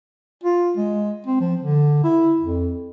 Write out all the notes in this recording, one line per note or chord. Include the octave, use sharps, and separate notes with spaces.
F4
G#3
C4
F3
D3
E4
F2